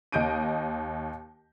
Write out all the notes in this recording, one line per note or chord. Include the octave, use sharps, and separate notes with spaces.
D#2 D#5 G6 D7 D#7